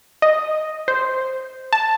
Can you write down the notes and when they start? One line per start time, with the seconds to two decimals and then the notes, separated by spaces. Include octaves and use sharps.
0.22 D#5
0.88 C5
1.73 A5